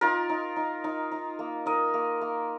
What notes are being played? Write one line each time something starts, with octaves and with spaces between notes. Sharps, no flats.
D#4 F4 A#4
D#4
D#4
D#4
D#4
A#3
D#4 A#4 D#5
A#3
A#3